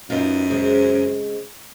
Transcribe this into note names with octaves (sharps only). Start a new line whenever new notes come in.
F#2 B3 D#4 F4
C#3 G#3 C4